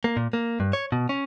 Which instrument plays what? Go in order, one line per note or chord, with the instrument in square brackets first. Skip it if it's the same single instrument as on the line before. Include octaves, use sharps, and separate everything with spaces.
[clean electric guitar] A#3
A#2
A#3
G2
C#5
B2
C#4